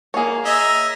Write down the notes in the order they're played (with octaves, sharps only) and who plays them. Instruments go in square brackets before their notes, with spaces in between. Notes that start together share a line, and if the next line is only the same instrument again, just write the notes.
[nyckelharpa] A#3 [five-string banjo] G#4 C#5
[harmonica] D#5 E5 [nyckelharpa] G#5 A#5